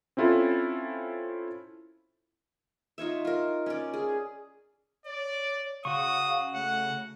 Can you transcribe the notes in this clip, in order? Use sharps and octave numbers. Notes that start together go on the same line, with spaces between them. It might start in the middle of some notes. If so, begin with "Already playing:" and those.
C4 C#4 E4 F4 A4 C5
D#4 F4 C#5 E5
F4 A#4
C#4 D5
G#4
C#5 D5
C#3 F#4 F5 C#6 D#6
A3 F#5